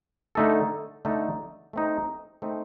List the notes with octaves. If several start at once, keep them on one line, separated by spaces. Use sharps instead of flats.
D3 A3 D#4 A4
D3 A3 D#4 A4
A3 C4 D#4
A3 C4 D#4